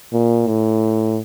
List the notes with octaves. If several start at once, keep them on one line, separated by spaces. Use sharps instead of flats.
A#2
A2